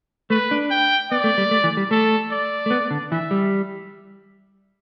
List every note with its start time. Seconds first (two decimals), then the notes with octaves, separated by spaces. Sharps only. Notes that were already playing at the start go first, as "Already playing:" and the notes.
0.30 A3 B4
0.51 D4
0.71 G5
1.11 B3 D5
1.24 A3
1.38 G3
1.51 A3
1.64 E3
1.77 G3
1.91 A3 A4
2.31 D5
2.66 A3
2.71 B3
2.91 D3
3.11 E3 E5
3.31 G3